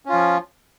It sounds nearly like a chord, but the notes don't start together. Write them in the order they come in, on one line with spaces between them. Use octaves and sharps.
C#4 F4 F3